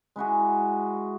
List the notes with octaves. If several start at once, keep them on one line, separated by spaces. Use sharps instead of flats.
G#3 E4 F#4 G#4